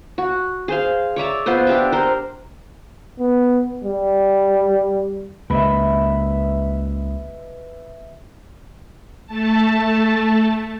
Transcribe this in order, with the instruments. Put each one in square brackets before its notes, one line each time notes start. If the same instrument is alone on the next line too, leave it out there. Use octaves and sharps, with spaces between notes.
[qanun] F#4
G#4 C5 F5
C#5 D5 E5 A#5
B3 F4 C5 D#5
D4 G4 E5
A#4 C5
[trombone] B3
G3
[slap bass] C#2 A#3 [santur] B4 D#5 E5
[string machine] A3 A5